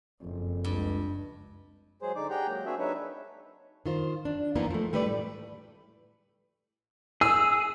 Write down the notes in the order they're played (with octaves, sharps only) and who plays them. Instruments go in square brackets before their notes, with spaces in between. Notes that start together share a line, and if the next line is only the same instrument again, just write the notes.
[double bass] F#1 [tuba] F2
[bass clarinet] C#2 [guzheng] G2
[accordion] F#3 G#3 G#4 C5
D3 D#4 D5 D6
G4 G#4 F#5 G5 A#5 G6
F#3 G#3 A#3
A#3 C4 D4 F#4 G#4 E5
F#3 D4 D#4 B4 C#5 E5
[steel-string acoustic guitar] D#3 F4 C5
D4
E3 F3 A#3 B3 D#4 A#4
F3 A3
G3 A3 G4 B4 C#5 D5
A2
[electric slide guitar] G#4 [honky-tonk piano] E6